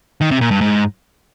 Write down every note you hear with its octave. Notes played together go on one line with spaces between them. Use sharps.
D#3
C3
A#2
G2
G#2